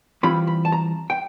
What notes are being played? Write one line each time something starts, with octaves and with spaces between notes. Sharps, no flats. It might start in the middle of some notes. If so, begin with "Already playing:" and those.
E3 G3 C4 F4 B5
B5
A5
A#5
G5